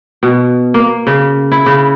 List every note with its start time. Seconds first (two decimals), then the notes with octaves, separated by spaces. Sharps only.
0.23 B2
0.74 A#3
1.07 C#3
1.52 E4
1.66 C#3